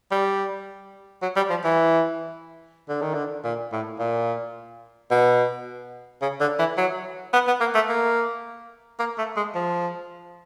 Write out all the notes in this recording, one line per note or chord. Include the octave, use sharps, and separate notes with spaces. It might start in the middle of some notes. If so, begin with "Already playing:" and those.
G3
F#3
G3
F3
E3
D3
D#3
D3
A#2
A2
A#2
B2
C#3
D3
E3
F#3
B3
B3
A#3
A3
A#3
A#3
A3
G#3
F3